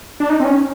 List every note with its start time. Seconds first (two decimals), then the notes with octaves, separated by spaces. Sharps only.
0.20 D4
0.30 D#4
0.40 C4
0.45 C#4